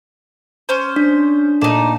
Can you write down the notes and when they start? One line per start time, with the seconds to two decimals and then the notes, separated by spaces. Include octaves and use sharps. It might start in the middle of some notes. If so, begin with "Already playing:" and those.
0.69 C#4 C5
0.96 D4
1.61 A#2 A3 D#4 D5 E7